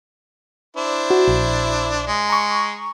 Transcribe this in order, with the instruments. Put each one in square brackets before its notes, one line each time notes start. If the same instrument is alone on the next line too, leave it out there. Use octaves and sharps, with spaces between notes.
[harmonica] D4 E4 C5
[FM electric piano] F#4
A#1
[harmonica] G#3
[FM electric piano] A#5 C#6